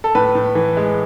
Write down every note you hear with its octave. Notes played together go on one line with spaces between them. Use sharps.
A4
A2 B4
A2
E3
G#3